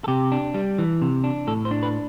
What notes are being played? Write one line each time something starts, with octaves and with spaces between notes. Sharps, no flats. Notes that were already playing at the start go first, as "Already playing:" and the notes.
A4
C3 G4
D4
G3
E3
C3
D4
A2 A4
C5
D4
B4